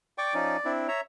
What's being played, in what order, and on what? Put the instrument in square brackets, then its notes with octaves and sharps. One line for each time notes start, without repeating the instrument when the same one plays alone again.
[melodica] D5 [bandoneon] G5 C#6 D6
[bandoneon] F3 C#4 D#4
C4 D4 E4
C#5 E5 A#5